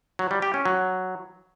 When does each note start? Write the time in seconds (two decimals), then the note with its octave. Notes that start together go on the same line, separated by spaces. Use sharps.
0.19 F#3
0.31 G3
0.42 G4
0.54 C#4
0.65 F#3